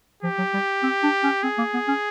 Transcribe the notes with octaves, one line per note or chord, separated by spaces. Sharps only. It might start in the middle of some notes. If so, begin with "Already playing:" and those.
F3 G4
F#3
G3
C4
D4
C#4
C4 G#4
A#3
B3
C#4